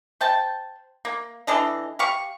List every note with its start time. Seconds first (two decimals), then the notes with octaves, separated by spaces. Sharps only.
0.21 C5 G5 A5
1.05 A#3
1.47 E3 D4 A4 D#5
1.99 G4 F5 C#6